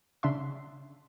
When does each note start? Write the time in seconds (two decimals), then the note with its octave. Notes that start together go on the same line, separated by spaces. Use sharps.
0.23 C#3 D4 E5 C6